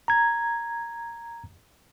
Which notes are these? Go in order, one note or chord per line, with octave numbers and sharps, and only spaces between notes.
A#5 G#6